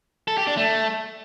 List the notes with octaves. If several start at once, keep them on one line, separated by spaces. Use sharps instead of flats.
A4
G4
D4
A3